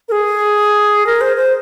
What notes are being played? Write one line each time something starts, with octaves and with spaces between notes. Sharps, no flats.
A#4
G#4
A#4
C5
C5